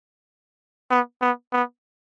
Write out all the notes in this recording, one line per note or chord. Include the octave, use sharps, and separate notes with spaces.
B3
B3
B3